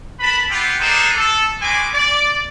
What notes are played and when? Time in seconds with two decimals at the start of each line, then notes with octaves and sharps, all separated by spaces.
0.20 A#4 B4 A5 B5
0.50 B3 E4 F4 G4
0.81 D4 D#4 F4 G#4 A4 C5
1.17 A4
1.61 G3 G#3 F#4 B4 G#5 D6
1.93 D5